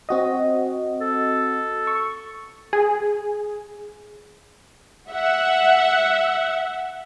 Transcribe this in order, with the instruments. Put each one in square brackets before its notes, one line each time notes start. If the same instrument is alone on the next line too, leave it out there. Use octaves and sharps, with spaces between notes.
[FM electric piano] C4 F#4 D#5
[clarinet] A4
[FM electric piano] C#6
[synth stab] G#4
[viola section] E5 F#5